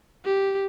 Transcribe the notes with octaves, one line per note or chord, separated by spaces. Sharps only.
G4